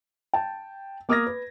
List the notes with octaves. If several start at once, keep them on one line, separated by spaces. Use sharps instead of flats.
G5 A5
A#3 D6 D#6 F6 G#6 A#6
B4